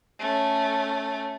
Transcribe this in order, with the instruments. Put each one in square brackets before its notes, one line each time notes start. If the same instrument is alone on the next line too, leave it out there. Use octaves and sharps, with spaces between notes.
[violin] A3 C#4